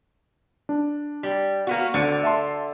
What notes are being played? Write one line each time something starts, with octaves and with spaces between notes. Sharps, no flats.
D4
G3
A#3 B3 F#4
D2 D3 A6 C#7
E5 A5 C6